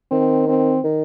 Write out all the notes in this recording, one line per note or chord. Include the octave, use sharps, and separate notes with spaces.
D#3 C4
C4
D#3